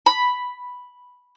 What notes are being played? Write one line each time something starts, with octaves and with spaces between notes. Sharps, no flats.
B5